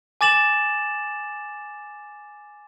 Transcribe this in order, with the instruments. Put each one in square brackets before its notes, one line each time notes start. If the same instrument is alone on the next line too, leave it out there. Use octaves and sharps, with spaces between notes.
[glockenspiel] G#5 D6 A6 E7 F#7